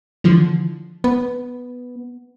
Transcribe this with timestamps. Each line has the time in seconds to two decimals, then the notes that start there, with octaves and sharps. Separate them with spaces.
0.24 D3 E3 F3
1.04 B3